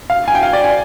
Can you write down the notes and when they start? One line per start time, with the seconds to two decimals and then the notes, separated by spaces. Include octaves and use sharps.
0.10 F5
0.28 G#5
0.35 G5
0.43 F5
0.53 D5
0.64 G#5